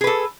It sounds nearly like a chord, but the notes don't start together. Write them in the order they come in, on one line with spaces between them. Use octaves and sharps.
G#4 B4 A4